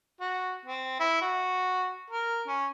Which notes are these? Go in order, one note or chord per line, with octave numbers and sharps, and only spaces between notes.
F#4
C4
E4
F#4
A#4
C#4